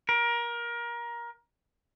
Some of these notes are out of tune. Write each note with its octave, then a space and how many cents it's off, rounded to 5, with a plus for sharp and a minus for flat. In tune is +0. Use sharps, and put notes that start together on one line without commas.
A#4 +25